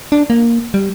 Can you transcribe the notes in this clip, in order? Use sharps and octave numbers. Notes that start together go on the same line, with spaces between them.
D4
A#3
G3